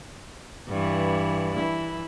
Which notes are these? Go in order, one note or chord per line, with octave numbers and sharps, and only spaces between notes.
G2 E3
E3 E4